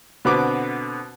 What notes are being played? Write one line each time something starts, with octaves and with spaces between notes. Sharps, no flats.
B2 D3 B3 C4 B4 D6